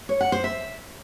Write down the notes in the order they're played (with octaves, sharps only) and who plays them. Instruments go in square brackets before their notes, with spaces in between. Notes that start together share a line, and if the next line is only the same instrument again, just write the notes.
[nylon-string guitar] C#5
F#5
C5
E5